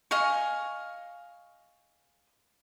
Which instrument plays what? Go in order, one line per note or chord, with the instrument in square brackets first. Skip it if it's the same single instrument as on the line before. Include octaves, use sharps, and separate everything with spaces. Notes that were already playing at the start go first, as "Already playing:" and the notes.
[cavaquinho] D#5 F5 G#5 C#6